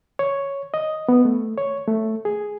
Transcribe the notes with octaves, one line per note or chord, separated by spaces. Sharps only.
C#5
D#5
B3
A3
C#5
A3
G#4